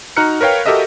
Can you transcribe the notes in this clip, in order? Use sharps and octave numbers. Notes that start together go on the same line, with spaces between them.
D#4 F#4 A#5 F6 F#6 C#7
A#4 B4 C#5 F5 G5
F#4 G4 A4 A#4 D#5 E5